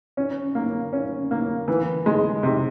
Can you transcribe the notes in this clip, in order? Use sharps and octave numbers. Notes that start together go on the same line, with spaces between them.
C#4
A#3
C#4
A#3
E3
G#3
C3